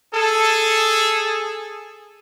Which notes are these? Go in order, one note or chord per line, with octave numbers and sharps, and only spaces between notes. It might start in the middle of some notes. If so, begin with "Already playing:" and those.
G#4 A4